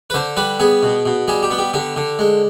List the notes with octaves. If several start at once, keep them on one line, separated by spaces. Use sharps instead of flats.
B4
D3 C5
G3 B4
B3 G#4
B2
B2
G3 G#4
G4
B3
G4
D3 G4
D3
G#3